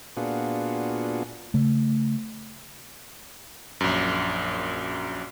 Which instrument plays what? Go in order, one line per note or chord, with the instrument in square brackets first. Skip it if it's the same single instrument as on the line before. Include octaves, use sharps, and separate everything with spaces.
[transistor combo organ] A#2 B3 D4 F4 F#4 G#4
[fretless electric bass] C#3 A3
[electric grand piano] A#1 F#2